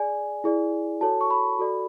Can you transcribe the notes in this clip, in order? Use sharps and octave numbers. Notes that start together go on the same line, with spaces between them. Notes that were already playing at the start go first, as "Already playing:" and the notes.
Already playing: G#4 D5 G#5
E4 G#4 D5
F#4 A4 C#5 A5
C#6
B5
F#4 A4 D5